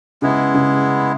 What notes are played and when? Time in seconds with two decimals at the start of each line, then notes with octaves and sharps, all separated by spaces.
0.22 C#3 G#3 B3 E4
0.54 C#3